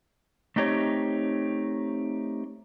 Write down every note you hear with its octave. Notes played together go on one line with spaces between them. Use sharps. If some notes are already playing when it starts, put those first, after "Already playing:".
A3 C4 D#4 G4 C#5